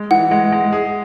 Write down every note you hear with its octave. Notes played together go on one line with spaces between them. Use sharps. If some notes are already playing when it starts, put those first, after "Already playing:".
Already playing: G#3
E3 F#5
G#3
G#3
G#4